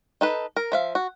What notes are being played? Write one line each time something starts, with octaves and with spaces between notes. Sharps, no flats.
D#4 A4 B4
A#4
F3 E5 F5
F#4